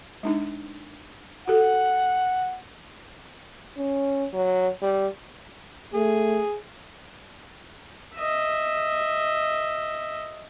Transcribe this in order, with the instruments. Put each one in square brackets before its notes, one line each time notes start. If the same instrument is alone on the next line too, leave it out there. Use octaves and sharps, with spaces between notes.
[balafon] G#3 D4 D#4
[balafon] F#4 G4 A4 [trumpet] F#5
[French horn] C#4
F#3
G3
[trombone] A3 [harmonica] G#4
[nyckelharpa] D#5 E5